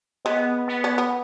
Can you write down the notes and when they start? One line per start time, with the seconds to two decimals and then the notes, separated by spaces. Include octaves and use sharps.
0.25 G#3 B3
0.68 B3
0.84 C#4
0.98 B3